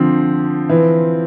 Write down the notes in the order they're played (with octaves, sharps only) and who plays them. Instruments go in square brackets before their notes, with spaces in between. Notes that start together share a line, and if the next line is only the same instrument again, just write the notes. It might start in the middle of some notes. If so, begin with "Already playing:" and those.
Already playing: [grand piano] D3 [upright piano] F3 C4
[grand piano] E3